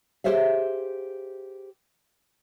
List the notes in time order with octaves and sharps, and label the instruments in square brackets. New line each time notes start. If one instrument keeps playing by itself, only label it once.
[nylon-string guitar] G4 G#4 C5 C#5 E5 F5